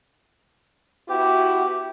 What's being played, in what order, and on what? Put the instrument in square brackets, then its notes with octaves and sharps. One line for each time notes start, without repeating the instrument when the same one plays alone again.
[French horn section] B3 E4 F#4 [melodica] G4